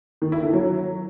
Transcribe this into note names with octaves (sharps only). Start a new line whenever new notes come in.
D#3
E4
D3
F#3